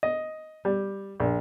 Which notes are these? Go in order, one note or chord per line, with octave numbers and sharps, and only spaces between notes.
D#5
G3
A#1